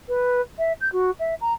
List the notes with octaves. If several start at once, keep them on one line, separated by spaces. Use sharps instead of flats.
B4
E5
G6
F#4
E5
A#5